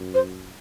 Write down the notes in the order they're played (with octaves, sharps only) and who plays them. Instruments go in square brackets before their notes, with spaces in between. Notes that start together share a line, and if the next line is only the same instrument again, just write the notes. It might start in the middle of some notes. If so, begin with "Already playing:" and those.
Already playing: [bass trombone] F#2
[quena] C5